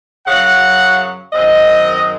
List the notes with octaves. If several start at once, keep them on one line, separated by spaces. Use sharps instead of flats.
F#2 C#3 F#3 F#5
F#2 D#3 G#3 C4 D#5